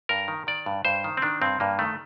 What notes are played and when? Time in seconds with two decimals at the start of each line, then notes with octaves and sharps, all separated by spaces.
0.09 G2 A#4
0.28 D#3
0.47 D#3 D5
0.66 G2
0.85 G2 C5
1.04 D#3
1.17 C4
1.22 D#3 D4
1.41 G2 C4
1.60 G2 A#3
1.79 D#3 A3